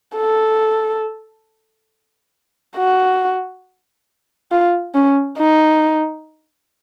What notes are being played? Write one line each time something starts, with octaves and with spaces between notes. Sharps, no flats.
A4
F#4
F4
C#4
D#4